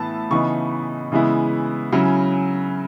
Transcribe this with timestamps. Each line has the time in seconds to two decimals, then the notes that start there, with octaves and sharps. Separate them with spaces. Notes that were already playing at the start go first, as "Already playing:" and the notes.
Already playing: A2 E3 B3 E4 A5 B5
0.30 C#3 E3 B3 D#4 C#6
1.12 C#3 E3 G#3 B3 E4
1.92 C#3 F#3 C#4 E4